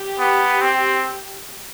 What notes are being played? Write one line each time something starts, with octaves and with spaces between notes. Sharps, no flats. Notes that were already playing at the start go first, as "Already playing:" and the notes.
Already playing: G4
B3
C4